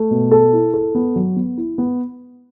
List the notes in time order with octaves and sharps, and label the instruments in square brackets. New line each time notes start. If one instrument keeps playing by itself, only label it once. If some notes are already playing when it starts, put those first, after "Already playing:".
Already playing: [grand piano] A3
B2
A4
E4
A4
B3
F#3
B3
E4
B3